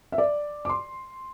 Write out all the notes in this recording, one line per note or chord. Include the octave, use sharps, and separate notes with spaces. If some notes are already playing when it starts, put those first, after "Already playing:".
E5
D5
D6
C6